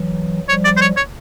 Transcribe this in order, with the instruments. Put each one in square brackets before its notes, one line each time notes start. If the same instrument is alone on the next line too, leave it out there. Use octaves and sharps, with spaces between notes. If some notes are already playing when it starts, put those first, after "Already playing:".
Already playing: [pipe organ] E3 F#3
[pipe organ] F3 G3 [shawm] C#5
[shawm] D5
C5
C#5
C#5